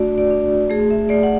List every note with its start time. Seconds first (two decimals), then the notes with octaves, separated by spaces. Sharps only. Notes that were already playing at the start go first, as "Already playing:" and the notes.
Already playing: A3 D4 F#4 D5
0.18 D5
0.30 D4
0.70 A3 G#4
0.91 E5
1.09 A3 D5
1.23 F#5